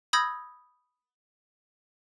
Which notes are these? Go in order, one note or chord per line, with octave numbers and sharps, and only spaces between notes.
B5 D#6 E6 G6 G#6 A#6